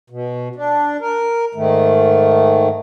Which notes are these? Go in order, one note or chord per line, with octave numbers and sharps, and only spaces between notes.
B2
D4
A#4
G#2 D#3 A3